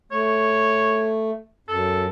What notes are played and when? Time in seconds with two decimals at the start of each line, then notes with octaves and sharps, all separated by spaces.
0.12 A3 C#5
1.68 F#2 A4